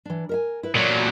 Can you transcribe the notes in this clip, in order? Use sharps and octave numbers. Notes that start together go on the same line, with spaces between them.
E3 D4
A#4 E5 G#5
E4 B4
A#2 F#3 D5